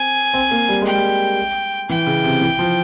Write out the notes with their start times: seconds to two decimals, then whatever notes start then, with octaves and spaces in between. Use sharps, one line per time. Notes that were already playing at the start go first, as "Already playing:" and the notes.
Already playing: C4 G#5
0.34 C4
0.51 A#3
0.69 G3
0.82 G#3 G5
0.95 G3
1.89 E3 G5
2.07 C#3
2.24 C3
2.41 E3
2.59 F3